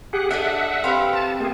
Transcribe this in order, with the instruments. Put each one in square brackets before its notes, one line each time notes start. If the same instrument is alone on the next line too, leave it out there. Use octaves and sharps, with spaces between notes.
[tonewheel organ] G4 G#4 F#5
[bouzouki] D4 A4 D#5 [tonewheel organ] E5 F#5
[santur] C4 B4 B5 [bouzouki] G4 F5
[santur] C5 [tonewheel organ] A5
[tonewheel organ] A#3 G#4 [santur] G5